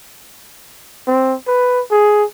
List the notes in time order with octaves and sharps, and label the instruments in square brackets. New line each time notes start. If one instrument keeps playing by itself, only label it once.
[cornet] C4
B4
G#4